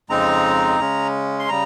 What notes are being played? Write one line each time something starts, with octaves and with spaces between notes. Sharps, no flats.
F2 C#3 G#3 C4 D#4 A#5
C#3 G#3 C#4
C6
C#3 G3 A#5